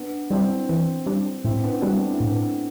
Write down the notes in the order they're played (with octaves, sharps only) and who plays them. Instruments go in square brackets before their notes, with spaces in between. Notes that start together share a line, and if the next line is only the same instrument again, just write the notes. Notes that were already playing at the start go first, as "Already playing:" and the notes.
Already playing: [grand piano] B3 D4
[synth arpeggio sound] G3 D4 [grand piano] C4 E4
[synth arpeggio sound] E3
G3 D4
[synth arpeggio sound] A2 [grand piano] C4 E4
[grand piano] B3 D4
[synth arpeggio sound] G3 B3 D4 F#4 [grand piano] A3 C4
[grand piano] D4
E4
[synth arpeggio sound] A2
[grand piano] B3 D4